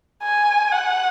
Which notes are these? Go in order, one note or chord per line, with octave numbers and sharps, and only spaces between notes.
G#5
F#5